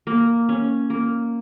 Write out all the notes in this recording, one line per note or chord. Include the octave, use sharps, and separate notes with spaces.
A#3
C#4
A#3